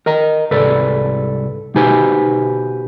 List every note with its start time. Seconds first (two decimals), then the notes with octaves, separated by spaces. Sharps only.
0.06 A#4 D#5 A#5
0.51 C2 G#2 A4 B4 D5
1.75 B2 D#4 G4 B4 C5 G#5